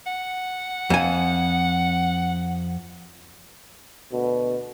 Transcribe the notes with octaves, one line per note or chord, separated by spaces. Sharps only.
F#5
F2 G#5
D2 B2